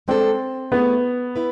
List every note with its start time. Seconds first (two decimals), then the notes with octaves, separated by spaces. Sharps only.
0.08 G#3 C4 D4 A4 C5
0.72 A3 B3 E4 G#4
1.36 E4 B4